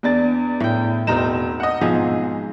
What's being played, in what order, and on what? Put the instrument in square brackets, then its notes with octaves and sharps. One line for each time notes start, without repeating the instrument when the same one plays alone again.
[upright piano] E2 D4 A6
[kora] A2 G5
[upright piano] E1 A#5 E7 [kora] C4 D#4
[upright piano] D#5 F#5
[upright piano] B1 [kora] G#2 F3 G#4